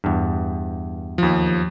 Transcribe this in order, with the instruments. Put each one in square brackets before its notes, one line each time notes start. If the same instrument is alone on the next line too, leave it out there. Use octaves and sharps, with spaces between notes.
[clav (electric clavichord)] E2 G2
[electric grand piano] D#2 F3